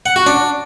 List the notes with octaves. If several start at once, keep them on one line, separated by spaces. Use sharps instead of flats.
F#5
F#4
D4